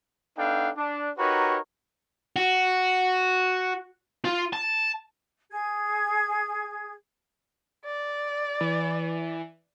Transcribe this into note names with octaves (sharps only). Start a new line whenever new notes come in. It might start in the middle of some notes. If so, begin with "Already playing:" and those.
B3 D4 D#4 A4 F5 G5
D4
D#4 F#4 G4 A#4 B4 C#5
F#4
F4
A5
G#4 G#6
D5
E3